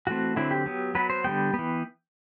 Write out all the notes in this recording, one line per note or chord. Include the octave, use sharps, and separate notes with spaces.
E3 A3 C4 F#4
D3 F#3 C4 E4
G4
F#3 B3
F#3 B3 B4
C5
D3 G3 B3 G5
E3 B3